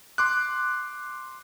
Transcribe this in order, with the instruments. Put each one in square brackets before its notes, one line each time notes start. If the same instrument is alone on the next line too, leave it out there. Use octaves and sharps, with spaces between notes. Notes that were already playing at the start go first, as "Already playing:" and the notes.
[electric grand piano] C6 D6 F#6